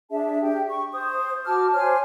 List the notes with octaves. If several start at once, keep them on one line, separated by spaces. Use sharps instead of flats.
D4 G#4 E5 A5
G4 G5
C#6
C5 D#6
F#4 A5 D6 F6
C5 C#5 G#5 F6